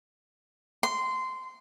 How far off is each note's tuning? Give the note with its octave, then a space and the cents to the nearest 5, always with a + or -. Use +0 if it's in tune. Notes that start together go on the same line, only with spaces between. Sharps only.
C6 -15